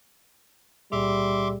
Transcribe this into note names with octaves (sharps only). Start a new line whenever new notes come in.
C#2 A#2 G3 G#4 E5 C6 D6